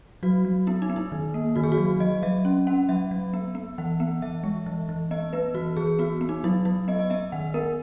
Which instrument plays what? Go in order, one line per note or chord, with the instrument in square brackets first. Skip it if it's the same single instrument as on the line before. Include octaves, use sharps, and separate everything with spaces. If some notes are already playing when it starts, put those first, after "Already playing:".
[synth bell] F#3 F#4
F#3
B3 E4
D#4
B3
E4
D#3
A#3
D#3 F#4
G#4
F#4
F#3
F#3 D#5
F#3 E5
C#4
C#4 F#5
F#3 E5
F#3
B3
B3
E3 F#5
B3
E3 E5
G#3
E3
E3
B3 D#5
B3 B4
E3 F#4
E3 G#4
B3 F#4
B3
D#4
F#3 E4
F#3 E4
B3 D#5
D#5
B3 E5
D#3 F#5
B3 A#4